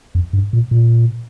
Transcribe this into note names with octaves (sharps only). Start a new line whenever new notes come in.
F2
G2
A#2
A#2